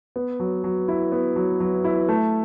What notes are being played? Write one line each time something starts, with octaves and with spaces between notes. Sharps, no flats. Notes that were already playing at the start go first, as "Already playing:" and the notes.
B3
F#3
F#3
E4
B3
F#3
F#3
E4
A3